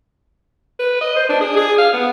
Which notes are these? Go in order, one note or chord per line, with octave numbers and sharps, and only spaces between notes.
B4
D#5
C5
D4
G#4
G#4
F5
B3